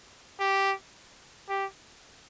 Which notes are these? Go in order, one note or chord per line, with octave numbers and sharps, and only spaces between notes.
G4
G4